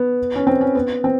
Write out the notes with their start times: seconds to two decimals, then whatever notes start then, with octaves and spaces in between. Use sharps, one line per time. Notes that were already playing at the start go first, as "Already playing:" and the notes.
Already playing: B3
0.36 C#4
0.47 C4
0.61 C#4
0.75 B3
1.04 C4